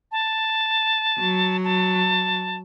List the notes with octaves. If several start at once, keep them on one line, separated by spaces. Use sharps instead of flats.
A5
F#3
A5